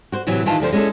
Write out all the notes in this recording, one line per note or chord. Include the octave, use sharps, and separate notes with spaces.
F#4 C5
A2 C3 E3 F#3
D#3 E3 F4 A5
D2 D3 F3 C5
G#3 C#4 E4 A4